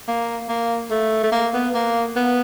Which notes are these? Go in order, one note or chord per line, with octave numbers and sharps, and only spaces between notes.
A#3
A#3
A3
A3
A#3
B3
A#3
B3